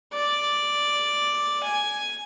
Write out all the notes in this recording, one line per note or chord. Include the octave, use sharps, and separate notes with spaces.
D5
G#5